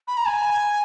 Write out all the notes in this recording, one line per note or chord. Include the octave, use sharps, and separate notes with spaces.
B5
A#5
G#5